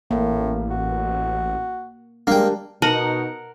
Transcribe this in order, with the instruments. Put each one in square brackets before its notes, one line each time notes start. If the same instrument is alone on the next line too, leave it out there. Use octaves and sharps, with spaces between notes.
[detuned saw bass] A1 [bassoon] A2 [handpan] A#3
[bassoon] F#4
[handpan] G3 D4 [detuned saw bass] G#3 [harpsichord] A#3 G5
[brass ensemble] B2 D#4 [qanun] A#4 F#5 [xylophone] A5